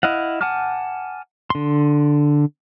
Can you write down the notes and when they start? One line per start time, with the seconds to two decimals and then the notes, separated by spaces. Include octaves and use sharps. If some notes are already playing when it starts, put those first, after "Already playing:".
0.03 E4 D#5 F5 F#5
0.41 F#5 G#5 A5 D6 F6
1.50 D3 C6